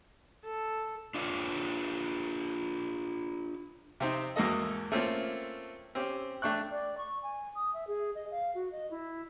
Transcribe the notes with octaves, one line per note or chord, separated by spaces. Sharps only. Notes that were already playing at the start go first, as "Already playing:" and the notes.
A4
D4 F4 B4 C#5
C3 C4 D#4
E2 G#2 A#3 F#4 A4 D#5
A3 A#3 C4 C#4 F4
C4 C#4 G4
A3 D4 G5 C#6 F#6
D5
C#6
G#5
D#6
E5
G#4
D#5
F5
F#4
D#5
E4